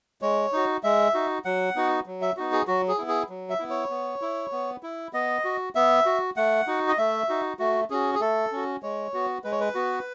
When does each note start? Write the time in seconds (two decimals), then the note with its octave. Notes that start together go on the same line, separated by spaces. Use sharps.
0.22 G#3 C#5
0.53 D#4 F#4
0.83 G#3 E5
1.14 D#4 F#4
1.45 F#3 F#5
1.76 B3 D#4 F#4
2.06 F#3
2.22 E5
2.37 B3 D#4 F#4
2.52 G#4
2.67 F#3 F#4
2.88 G#4
2.98 B3 E4
3.08 G#4
3.29 F#3
3.50 E5
3.59 B3 E4
3.70 C#5
3.90 B3
4.22 E4
4.52 B3
4.83 E4
5.13 B3 D#5
5.45 F#4
5.75 B3 E5
6.06 F#4
6.37 A3 F#5
6.67 D#4 F#4
6.88 D#5
6.98 A3 E5
7.29 D#4 F#4
7.59 A3 F#4
7.90 C#4 F#4 G#4
8.15 G#4
8.21 A3 A4
8.52 C#4 F#4
8.83 G#3 C#5
9.14 B3 F#4
9.44 G#3 B4
9.52 C#5
9.60 B4
9.75 B3 F#4